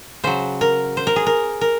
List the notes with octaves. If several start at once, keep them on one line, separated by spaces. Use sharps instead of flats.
C#3 F#3 C5
A#4
C5
A#4
G#4
A#4
A#4